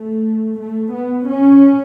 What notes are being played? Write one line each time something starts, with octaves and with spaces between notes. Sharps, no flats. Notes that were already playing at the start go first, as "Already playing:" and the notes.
Already playing: A3
A3
B3
C#4